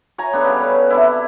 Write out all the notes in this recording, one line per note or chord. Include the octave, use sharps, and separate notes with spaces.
C#5 G#5 A#5
B3 D4 A4
C#3 G3
C#4 B4
C3 D4 E4